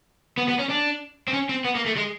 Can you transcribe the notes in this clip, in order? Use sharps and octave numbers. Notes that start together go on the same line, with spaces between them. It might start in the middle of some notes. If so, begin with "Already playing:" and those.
B3
B3
C#4
D4
C4
C#4
C4
B3
A#3
A3
G#3